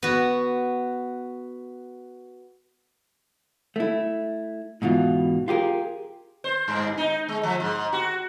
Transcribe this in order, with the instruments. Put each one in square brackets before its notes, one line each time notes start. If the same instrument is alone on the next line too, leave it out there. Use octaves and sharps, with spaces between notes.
[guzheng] B3 F#4
[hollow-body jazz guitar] A3 E4
G#2 B2 E3 F4
F4 G4 G#4 A#4
[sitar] C5
G2
D#4
G#3
F3
G#2
F#4